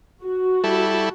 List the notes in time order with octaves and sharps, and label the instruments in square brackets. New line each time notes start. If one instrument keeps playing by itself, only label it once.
[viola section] F#4
[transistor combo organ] G3 E4 A4